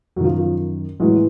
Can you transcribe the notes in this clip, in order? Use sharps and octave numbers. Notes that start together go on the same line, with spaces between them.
F#2 D#3 F3 F#3
F3
A2 E3 F#3 G#3